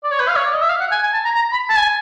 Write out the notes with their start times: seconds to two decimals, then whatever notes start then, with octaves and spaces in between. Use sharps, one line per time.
0.04 D5
0.11 C#5
0.20 B4
0.28 F5
0.36 C#5
0.45 D5
0.53 D#5
0.62 E5
0.69 F5
0.80 F#5
0.92 G#5
1.03 G#5
1.13 A5
1.25 A#5
1.35 A#5
1.52 B5
1.69 A5
1.77 G#5